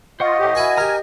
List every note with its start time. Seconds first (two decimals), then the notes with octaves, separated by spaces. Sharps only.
0.20 F4 C5 D#5 F#5 C#6
0.39 A2 G4
0.55 E4 F#4 A#4 G#5
0.77 G4 A#4 A#5 F6